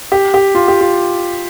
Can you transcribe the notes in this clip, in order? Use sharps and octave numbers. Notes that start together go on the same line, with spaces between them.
G4
G4
F4
G4
F4